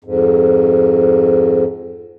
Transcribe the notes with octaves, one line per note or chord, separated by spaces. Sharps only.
F2 G#2